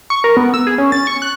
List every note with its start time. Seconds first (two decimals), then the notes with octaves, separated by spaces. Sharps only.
0.10 C#6
0.24 A#4
0.37 B3
0.54 E6
0.67 G#4
0.78 C#4
0.92 A6
1.07 C#6
1.22 F#6